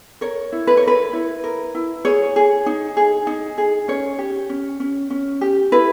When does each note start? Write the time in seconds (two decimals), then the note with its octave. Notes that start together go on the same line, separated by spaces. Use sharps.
0.21 A#4 C#5
0.52 E4
0.67 B4
0.77 C#5
0.83 A#4 B4
1.13 E4
1.44 A#4
1.75 E4
2.05 G#4 C#5
2.36 G#4
2.66 D#4
2.97 G#4
3.27 D#4
3.58 G#4
3.88 C#4 C#5
4.19 G4
4.50 C#4
4.80 C#4
5.10 C#4
5.41 G4
5.72 E4 B4